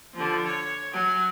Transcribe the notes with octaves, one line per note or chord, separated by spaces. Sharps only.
D3 F3
C#5
F#3 G#5